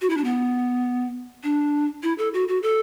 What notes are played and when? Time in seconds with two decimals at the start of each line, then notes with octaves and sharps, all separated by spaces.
0.01 F#4
0.10 E4
0.17 D4
0.24 B3
1.43 D4
2.03 E4
2.18 A4
2.34 F#4
2.48 F#4
2.63 A4